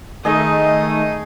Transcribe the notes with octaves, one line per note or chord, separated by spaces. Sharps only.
D#3 A3 D#4 G#4 D#5